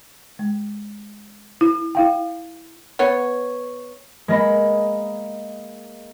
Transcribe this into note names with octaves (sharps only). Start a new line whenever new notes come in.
G#3
E4
E4 F5 G5
B3 C#5
G#3 A#3 D#5 B5